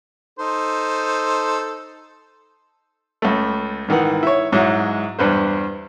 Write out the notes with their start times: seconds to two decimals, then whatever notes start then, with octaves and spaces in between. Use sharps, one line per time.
0.39 D#4 A4 C5
3.22 C#2 A3
3.88 G#2 D#3 E3 F#5
4.23 E4 C#5
4.52 G#2 F#3 G#3 E4
5.19 E2 G2 B4 C5